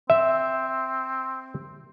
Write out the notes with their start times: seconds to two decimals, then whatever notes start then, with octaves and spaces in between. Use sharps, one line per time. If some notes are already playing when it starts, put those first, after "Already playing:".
0.10 C4 E5